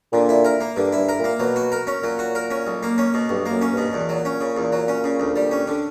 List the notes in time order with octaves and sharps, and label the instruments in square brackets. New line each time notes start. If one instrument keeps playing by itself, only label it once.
[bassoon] A#2 [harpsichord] D3
[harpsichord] E4
A#4
A#3
[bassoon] G2 [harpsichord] D3
[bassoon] G2 [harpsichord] E4
[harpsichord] A#4
[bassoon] A#2
[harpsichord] A#3
[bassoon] B2 [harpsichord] F#3
[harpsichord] F#4
A#4
C#4
[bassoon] A#2 [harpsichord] F#3
[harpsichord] F#4
A#4
C#4
B1
A#3
C#4
B2
[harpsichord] B1 [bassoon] G2
[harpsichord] A#3
[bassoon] F#2
[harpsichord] C#4
[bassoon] G2 [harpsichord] B2
[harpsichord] E2 [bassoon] A#2
[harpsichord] F#3
C#4
C#3
E2
F#3
C#4
C#3
D2
G3
C#4
D3